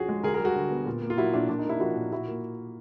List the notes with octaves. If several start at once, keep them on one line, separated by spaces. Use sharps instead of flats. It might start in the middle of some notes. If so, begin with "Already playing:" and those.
Already playing: D2 F3 C#4 F#4 G#4
G#3
D2 G#4 A#4
G#4 A#4
G3
F#4 G#4
D3
B3
A#2
A#3
F4
F#3 E4 F#4
A#2 D4 E4
A#2 D4
D#4
A#3 D4 E4
F3 E4 F#4
A#2
A#2 E4 F#4
A#3